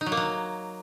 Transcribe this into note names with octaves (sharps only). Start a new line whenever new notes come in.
D#4
F#3
A#3
F#3